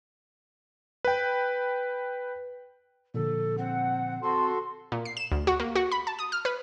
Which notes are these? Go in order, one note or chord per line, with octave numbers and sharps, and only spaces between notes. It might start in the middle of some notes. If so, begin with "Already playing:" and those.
B4 G5
A#2 D3 F3 A4
C4 F#5
C4 F#4 A4 C6
A#2
C7
E7
D2
F#4
A#3
F#4
B5
A5
D#6
F6
B4